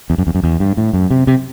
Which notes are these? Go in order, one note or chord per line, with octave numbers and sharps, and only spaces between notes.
E2
F#2
E2
F#2
E2
G2
A2
F#2
C3
C3